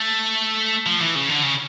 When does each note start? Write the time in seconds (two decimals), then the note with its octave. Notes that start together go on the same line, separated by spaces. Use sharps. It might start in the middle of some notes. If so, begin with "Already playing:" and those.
Already playing: A3
0.86 F3
1.00 E3
1.15 C#3
1.29 D3
1.43 C#3